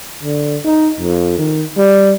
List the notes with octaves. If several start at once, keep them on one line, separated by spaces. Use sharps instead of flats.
D3
D#4
F2
D#3
G3